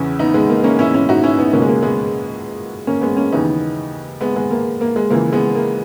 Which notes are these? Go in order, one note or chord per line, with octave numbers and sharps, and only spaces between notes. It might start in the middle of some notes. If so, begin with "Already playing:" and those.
Already playing: E2 C#3 E3 C#4 E4
B3 D#4
G#3 B3
A#3
A#3 C#4
C#4 E4
C#4 E4
D#4 F#4
C#4 E4
B3 D#4
C#2 B2 A#3 C#4
G#3
A#3
G#3 B3
A#3 C#4
G#3 B3
A#3 C#4
D#2 C#3 E3 B3 D#4
G#3 B3
G#3 B3
A#3
A#3
G#3
C#2 C#3 E3 A#3
G#3 B3
A#3